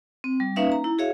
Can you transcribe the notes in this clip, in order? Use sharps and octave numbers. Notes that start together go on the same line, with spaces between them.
C4
G3
A#3 C#4 D#4 B4 E5 F5
A#5
E4
F#4 G#4 C#5 E5 F5